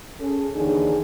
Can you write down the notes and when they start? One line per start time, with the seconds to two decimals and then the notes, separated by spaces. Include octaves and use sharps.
0.20 C#4 G#4 A4
0.56 D#2 D3 E3 D4 D#4 G#4